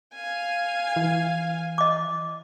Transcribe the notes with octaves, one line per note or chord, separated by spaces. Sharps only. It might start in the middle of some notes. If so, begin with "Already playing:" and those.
F5 G#5
E3
D#5 D6